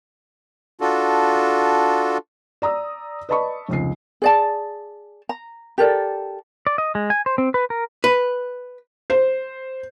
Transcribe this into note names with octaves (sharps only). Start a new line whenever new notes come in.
D4 F4 F#4 A4
D5 A#5 D#6 E6
B4 D5 D#5 A5 B5 C#6
F1 C#2 C7
G#4 D5 A5
A#5
G4 A4 A#4 D5
D5
D#5
G#3
G#5
C5
C4
B4
A#4
B4
C5